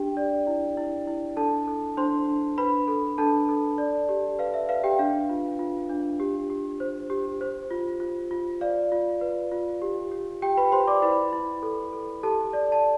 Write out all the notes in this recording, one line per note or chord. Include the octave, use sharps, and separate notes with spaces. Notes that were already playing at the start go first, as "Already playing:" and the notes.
Already playing: D4 G4 G5
D5
E4
E4
E4
D4 A4 A5
A4
D4 C5 C6
D4
D4 B4 B5
A4
D4 A4 A5
A4
D5
G4
B4 F5
E5
B4 F5
G4 G5
D4 F5
F4
F4
D4
G4
G4
C5
G4
C5
F4
F4
F4
D5 F5
F4
B4
F4
G4
G4
G4 G5
B4 B5
G4 C5 C6
D5 D6
E4 B4 B5
E4
A4
A4
G4 A4 A5
D5
A5